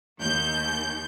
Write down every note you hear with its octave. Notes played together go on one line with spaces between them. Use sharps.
D#2 G6